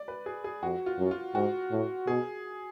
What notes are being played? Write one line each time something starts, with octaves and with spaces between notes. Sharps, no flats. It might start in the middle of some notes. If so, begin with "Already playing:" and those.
Already playing: D5
B4
G#4
G#4
F2 F#4
F4
F#2
F4
G#2 F#4
A2
B2 G#4